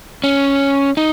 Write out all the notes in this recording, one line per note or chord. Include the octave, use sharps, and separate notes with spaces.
C#4
D#4